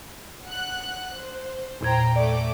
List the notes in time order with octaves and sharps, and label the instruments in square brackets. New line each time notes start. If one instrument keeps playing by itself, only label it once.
[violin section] F#5 F#6
C5
[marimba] E2 A#2 G#6 [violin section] C5 G5 A#5
[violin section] A3 D6 [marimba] D5